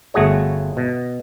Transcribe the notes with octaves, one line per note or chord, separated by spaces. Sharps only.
G1 A3 F#4 G#4 C#5
B2